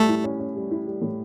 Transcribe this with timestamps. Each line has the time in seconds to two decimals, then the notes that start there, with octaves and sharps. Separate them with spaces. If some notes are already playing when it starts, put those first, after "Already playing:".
Already playing: A2 G3 A3 A4
0.09 E4
0.24 C#4
0.40 C#4
0.56 G3
0.71 E4
0.87 G3
1.02 A2